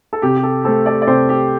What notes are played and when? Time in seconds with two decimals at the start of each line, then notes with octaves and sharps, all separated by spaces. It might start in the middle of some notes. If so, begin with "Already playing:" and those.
0.13 A4
0.22 C3 G4
0.36 G4
0.43 A4
0.65 A3 C4 A4
0.86 A4 D5
1.02 D5
1.07 C3 G4 C5
1.29 G4